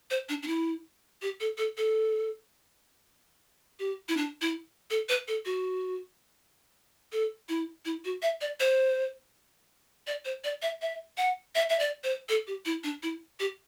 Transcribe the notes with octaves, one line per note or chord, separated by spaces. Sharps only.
C5
D4
D4
E4
G4
A4
A4
A4
G4
E4
D4
E4
A4
B4
A4
F#4
A4
E4
E4
F#4
E5
D5
C5
D5
C5
D5
E5
E5
F#5
E5
E5
D5
C5
A4
G4
E4
D4
E4
G4